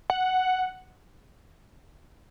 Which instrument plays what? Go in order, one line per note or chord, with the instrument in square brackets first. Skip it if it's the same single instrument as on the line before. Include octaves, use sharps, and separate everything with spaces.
[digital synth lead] F#5